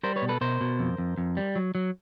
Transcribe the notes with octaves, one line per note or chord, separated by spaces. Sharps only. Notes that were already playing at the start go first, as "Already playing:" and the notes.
G3 A#4 C5
B4 C#5
B2
A4 B4
B2 A#4 C5
B2
F2
F2
F2
G3
F#3
F#3